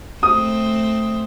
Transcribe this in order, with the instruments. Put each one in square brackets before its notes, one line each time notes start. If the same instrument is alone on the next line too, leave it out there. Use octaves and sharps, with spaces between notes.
[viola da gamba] A3 C4 [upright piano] D#6